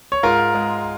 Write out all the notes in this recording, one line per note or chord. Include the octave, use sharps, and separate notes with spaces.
C#5
G#2 F4 A#4
G#3